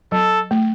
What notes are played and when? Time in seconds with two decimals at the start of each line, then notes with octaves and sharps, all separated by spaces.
0.12 F#3 A4
0.51 A3